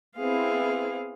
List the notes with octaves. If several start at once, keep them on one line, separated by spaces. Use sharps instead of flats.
B3 C4 E4 G#4 F5